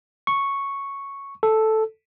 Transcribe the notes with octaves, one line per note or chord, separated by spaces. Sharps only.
C#6
A4